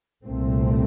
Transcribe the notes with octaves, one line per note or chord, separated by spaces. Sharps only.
C2 A#2 A3 C4